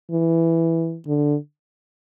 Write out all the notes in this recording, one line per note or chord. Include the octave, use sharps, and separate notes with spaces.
E3
D3